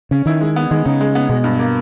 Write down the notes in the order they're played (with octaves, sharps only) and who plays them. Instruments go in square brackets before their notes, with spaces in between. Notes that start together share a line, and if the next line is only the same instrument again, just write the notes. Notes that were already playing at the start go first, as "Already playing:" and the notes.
[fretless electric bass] C#3 [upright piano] C#4
[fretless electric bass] D#3 [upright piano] E4
[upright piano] G#3
B3
[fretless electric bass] D#3 [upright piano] G#3
[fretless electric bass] C#3 [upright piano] D#4
[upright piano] G#3
B3
[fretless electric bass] B2 [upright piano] G#3
[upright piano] G2
A#3